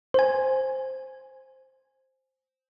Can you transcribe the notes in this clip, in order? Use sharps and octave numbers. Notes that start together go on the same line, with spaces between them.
C5 G#5